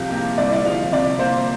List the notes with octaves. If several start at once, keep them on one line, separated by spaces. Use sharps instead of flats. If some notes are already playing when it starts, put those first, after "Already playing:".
Already playing: C2 C3 F3 F4 G4
A#3 G4
C2 D5
D5
F3 F5
C3 D5
A#3 C5